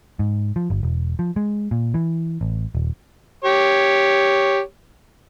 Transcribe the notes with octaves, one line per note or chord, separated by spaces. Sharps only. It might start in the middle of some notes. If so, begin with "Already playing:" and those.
G#2
F3
G1
E1
F3
G#3
A#2
E3
A1
D#1
G4 C#5